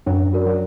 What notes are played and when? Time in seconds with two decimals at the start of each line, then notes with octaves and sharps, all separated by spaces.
0.06 F#2 F#3 D4
0.33 F#4 A#4 D5
0.46 F#3